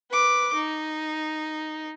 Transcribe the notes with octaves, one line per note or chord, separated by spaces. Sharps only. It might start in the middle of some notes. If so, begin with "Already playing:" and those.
B4 D6
D#4